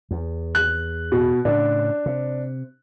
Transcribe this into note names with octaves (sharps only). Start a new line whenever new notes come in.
E2
F#6
B2
A2 C#3 D4
C3